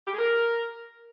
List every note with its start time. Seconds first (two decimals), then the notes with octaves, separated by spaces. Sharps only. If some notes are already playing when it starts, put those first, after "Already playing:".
0.07 G4
0.13 G#4
0.19 A#4